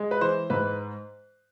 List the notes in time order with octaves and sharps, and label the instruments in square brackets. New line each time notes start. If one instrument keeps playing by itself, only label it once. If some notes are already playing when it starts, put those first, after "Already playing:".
Already playing: [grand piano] G#3
B4
E3 C5
G#2 B4